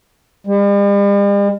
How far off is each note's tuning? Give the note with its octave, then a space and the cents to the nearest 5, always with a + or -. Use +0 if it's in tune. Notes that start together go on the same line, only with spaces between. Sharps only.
G3 +45